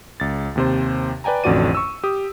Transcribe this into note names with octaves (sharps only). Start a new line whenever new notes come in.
C#2 A6
D#2 C3 C5
B4 D5 G5 G#5 A#5
A1 F2 D3 F#4 D5 D#7
C#6 E6
G4 D#6